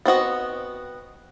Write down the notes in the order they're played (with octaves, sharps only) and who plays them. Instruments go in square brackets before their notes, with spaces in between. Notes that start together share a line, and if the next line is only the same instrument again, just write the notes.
[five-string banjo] B3 C4 F#4 D#5